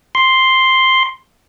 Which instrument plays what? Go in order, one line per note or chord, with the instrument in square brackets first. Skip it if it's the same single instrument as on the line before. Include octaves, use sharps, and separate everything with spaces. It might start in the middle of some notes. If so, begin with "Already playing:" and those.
[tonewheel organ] C6